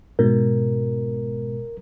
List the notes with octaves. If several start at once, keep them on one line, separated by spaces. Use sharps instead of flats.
G#2 B2 A#4